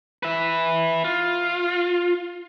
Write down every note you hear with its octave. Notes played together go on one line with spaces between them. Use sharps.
B4 E5
F4